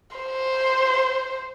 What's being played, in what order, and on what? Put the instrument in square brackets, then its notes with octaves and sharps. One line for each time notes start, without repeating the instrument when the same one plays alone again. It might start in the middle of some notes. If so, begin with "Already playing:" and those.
[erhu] C5